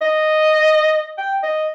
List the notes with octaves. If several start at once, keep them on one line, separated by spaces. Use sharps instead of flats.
D#5
G5
D#5